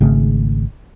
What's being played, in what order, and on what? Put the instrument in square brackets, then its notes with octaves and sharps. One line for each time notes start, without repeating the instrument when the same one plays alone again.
[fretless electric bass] G#1 C#3 A3